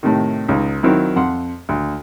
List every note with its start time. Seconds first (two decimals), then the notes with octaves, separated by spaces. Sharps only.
0.03 A2 C3 D#3
0.48 C#2 D#4
0.83 D#3 F#3 C4 E4
1.16 F2 F#5 C6
1.69 D2